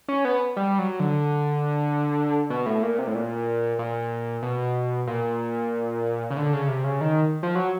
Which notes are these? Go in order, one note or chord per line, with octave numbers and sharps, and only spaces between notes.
C#4
B3
G3
F#3
D3
B2
A2
A#2
C3
A2
A#2
A#2
B2
A#2
C#3
D3
C#3
C3
C#3
D#3
F3
F#3